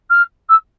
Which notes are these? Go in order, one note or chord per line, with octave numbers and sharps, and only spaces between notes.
F6
E6